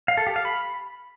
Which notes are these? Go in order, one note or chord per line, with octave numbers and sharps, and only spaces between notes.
F5
A4
G4
F5
B5